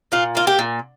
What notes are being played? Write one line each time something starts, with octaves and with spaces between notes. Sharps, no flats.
A#2 F4
A#3 F4
G4
A#2